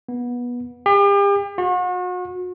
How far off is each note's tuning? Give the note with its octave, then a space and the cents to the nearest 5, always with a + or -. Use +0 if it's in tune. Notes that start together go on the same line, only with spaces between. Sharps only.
B3 -20
G4 +40
F#4 -40